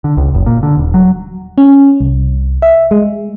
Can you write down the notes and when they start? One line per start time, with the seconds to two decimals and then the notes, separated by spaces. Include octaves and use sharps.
0.04 D3
0.17 C#2
0.35 F#1
0.46 A#2
0.63 D3
0.77 D#1
0.94 F#3
1.58 C#4
2.01 C2
2.62 E5
2.91 G#3